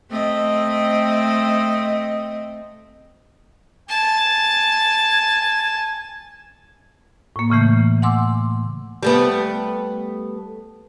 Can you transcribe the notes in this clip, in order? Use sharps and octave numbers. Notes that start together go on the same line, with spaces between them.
A3 C4 D#5
G#5 A5
A2 A#3
A2 C#3 E3 A3 G6
F#5 G#5 C6 D6 E6
G3 A3 B3